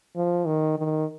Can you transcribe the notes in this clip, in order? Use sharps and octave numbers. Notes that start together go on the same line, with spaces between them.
F3
D#3
D#3